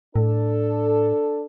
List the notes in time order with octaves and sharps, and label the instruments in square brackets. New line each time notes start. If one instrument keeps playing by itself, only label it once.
[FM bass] A2 [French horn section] D4 A4